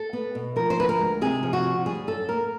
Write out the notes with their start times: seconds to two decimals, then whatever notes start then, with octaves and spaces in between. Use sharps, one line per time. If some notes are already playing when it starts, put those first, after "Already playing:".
Already playing: A4
0.13 B3
0.35 B2
0.56 F3 A#4
0.70 C5
0.78 D2 B4
0.89 A#4
0.99 G#3
1.21 C3 G#4
1.43 F3
1.53 F#4
1.64 D2
1.85 G3 G#4
2.07 F#2 A4
2.29 A#3 A#4